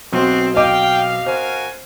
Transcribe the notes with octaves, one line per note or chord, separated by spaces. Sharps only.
B1 B2 C4 F#4 G4 C6
D#5 F5 G5 D6
F#4 A#4 C5 G#5